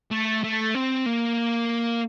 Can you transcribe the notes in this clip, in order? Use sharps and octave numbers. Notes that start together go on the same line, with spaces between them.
A3
A3
C4
A#3